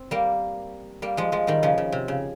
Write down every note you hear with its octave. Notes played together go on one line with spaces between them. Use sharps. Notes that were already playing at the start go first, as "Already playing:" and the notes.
Already playing: C4
G3 A#3
G3 A#3
F3 G#3
F3 G#3
D#3 G3
C#3 F3
C#3
C3
C#3